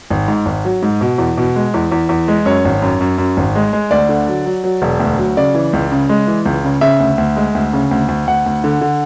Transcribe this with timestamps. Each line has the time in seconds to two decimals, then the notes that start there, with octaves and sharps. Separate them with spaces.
0.11 G#1
0.28 G#2
0.46 G#1
0.65 F#3
0.82 G#2
1.01 B2
1.18 E2
1.38 B2
1.56 G#3
1.74 E2
1.92 E2
2.09 E2
2.28 G#3
2.46 F#2 C#5
2.65 G#1
2.82 F#2
3.01 F#2
3.18 F#2
3.37 G#1
3.55 G#3
3.73 G#3
3.91 D2 D5
4.09 D3
4.28 F#3
4.46 F#3
4.64 F#3
4.82 E1
5.00 D2
5.18 F#3
5.37 C#3 D5
5.54 E3
5.73 C#2
5.92 C#3
6.09 G#3
6.27 E3
6.45 C#2
6.64 C#3
6.81 C#3 E5
7.00 D2
7.18 D2
7.36 G#3
7.55 D2
7.73 C#3
7.91 D2
8.08 D2
8.27 D2 F#5
8.46 D2
8.64 D3
8.81 D3